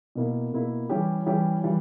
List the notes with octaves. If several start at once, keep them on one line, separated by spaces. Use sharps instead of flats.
B2 A#3 E4
B2 A#3 E4
E3 G3 C#4 G4
E3 G3 C#4 G4
E3 G3